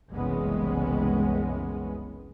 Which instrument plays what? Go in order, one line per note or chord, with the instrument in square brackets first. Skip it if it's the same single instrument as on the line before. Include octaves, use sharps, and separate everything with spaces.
[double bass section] F#1 C2 E3 G#3 B3 C#4